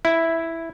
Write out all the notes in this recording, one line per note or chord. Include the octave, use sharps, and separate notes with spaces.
E4